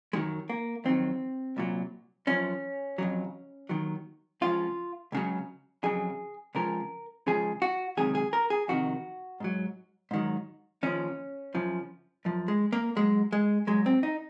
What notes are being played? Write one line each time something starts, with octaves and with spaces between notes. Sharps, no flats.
F#2 D#3 F#3 G#3
A#3
F2 D#3 F#3 C4
C2 A#2 F#3
F#2 F3 C#4
F2 C#3 F#3
D#2 D#3 F#3
C#2 C#3 F3 F4
C#2 C#3 F#3
F2 C#3 F#3 G#4
C#2 C#3 F3 A#4
C#2 C#3 F3 G#4
F#4
C#2 C3 D#3 F#3 G#4
G#4
A#4
G#4
F2 C3 D#3 F#4
G#2 F#3
G#2 D#3 F#3
D#2 C#3 F3 C#4
F#2 C#3 F3
F#2 F3
G#3
A#3
G#2 F#3 G#3
G#3
G#2 F#3 G#3
C4
D#4